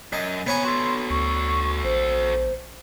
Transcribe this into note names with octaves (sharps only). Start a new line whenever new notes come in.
F#2 D#5
C3 B3 C#5 G#5 A#5
F#4 A4 C6
D2 C#6
A#1 C5